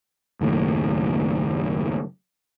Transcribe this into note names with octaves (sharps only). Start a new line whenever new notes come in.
F#1 D#2 A2